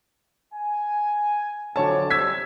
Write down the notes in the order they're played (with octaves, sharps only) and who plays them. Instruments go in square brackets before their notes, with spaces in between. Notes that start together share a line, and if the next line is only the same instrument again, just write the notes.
[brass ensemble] G#5
[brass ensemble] F2 F#3 D5 [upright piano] D3 C#5 A5
[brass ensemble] C3 G3 C#4 [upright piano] E6 G#6 B6